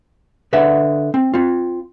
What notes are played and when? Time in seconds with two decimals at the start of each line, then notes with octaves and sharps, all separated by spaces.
0.53 D3 B4 E5 F#5
1.14 C4
1.34 C4 F4